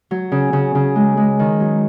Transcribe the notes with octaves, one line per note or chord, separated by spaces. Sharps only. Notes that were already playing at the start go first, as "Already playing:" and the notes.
F#3
C#3
C#3
C#3
G#3
G#3
D#3
F#3